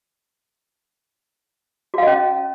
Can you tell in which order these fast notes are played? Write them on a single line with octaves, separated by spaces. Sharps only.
F#4 F5 D#5 C#4